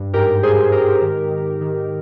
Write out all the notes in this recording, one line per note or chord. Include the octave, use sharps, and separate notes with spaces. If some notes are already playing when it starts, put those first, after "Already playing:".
Already playing: G2
G#2 G4 A#4
G#2 G#4 C5
G#2 G4 A#4
D#3
D#3
D#3